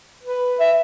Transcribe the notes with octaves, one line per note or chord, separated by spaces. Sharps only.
B4
E5